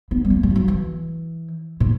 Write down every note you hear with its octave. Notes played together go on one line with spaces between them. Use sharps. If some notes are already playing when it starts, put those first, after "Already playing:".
B3
G3
A#3
G3
E3
F#3
E3
A#2